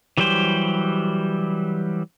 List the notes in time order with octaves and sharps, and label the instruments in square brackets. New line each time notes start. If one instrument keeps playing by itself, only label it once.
[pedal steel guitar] E3 F#3 G3 G4 C5